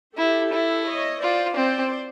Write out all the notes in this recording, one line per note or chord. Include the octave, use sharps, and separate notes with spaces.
E4 G4 A4
E4
C#5 D#5
F4 C5 D5
C4 C5 D5